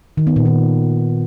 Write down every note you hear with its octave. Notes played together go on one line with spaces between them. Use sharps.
D#3
B3
A#2
D#3